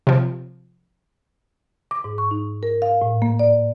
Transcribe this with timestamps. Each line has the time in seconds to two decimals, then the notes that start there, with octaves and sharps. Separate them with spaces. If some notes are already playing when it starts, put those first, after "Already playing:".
0.07 C3 F3
1.91 D6
2.04 G#2
2.18 C#6
2.31 D#4
2.63 A#4
2.82 F5
3.02 A2
3.22 A#3
3.39 D5